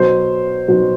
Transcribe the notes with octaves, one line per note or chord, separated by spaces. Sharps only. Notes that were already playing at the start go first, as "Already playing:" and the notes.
Already playing: B2 F#3 C5
B2 F#3